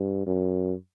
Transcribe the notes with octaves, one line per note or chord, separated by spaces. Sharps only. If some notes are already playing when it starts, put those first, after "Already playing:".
Already playing: G2
F#2